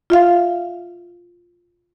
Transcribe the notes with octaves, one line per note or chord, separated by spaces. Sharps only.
F4 E5 F5